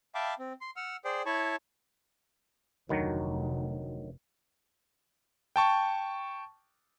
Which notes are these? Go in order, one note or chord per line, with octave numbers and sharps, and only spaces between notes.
E5 F5 G5 A5 B5 D6
C4
C6
F#5 E6 F6
G#4 C5 D5 G5
E4 C#5 A5 B5 C#6
F1 D2 D#3 F#3
G5 A5 C#6